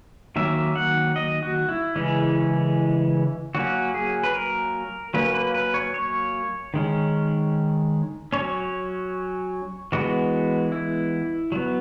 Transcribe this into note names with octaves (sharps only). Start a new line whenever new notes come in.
D#3 F#3 A#3 C#4 E5
F#5
D#5
F#4
E4
C#3 E3 G#3 C#4
F#3 A#3 C#4 F#4
G#4
B4
A#4
F#3 A#3 C#4 B4
B4
B4
C#5
C#5
D#3 G#3 C#4
F#3 C#4 C#5
E3 G#3 B3 F#4
E4
F#3 B3